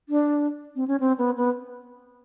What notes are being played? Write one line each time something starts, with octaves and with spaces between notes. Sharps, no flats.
D4
C4
C#4
C4
B3
B3